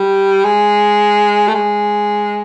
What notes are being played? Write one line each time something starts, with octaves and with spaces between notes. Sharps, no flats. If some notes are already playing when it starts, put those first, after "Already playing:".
Already playing: G3
G#3
A3
G#3